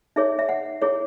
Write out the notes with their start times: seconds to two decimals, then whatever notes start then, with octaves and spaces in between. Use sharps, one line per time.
0.16 D#4 G#4 C#5 E5
0.39 E5
0.49 F#5
0.82 E4 G#4 C#5